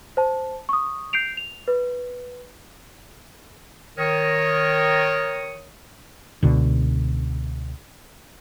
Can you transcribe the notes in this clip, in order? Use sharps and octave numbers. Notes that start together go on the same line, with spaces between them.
C5 A5
C#6 D#6
G6 C7 D7 F7
F7
B4
D#3 A#4 C#5 D#6
C#2 B2 D3